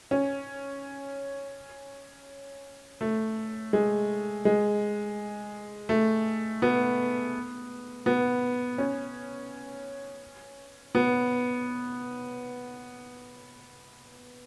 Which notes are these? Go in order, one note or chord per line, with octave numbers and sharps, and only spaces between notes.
C#4
A3
G#3
G#3
A3
B3
B3
C#4
B3